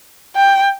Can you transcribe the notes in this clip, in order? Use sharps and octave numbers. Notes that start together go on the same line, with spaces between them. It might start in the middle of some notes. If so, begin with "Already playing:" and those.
G5